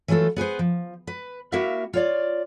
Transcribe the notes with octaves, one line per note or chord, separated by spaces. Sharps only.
E3 F#3 A3 F4 A4
B3 G#4 B4 C5
F3
B4
A#3 E4 F#4 G4 E5 F5
F4 C#5 D5